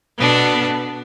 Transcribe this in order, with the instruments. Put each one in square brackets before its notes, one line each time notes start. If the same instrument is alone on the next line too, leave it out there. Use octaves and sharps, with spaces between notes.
[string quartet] B2 B3 D4 A4